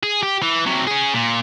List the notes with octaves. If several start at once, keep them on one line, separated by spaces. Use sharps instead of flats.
G#4
G4
E3
C3 F#3
C#4 G#4
A#2